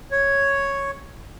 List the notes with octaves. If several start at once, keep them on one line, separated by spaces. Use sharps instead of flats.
C#5